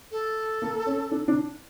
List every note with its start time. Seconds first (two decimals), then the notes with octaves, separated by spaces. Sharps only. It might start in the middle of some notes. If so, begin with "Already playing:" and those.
0.11 A4
0.62 A#3
0.86 C#4
1.11 D4
1.28 D4